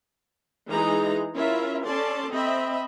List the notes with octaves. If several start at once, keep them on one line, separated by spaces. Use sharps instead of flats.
E3 G#3 D#4 G#4 A#5
C#4 E4 F4 A#4 E5
C#4 A4 D5 A5 C6
C4 D#5 E5 B5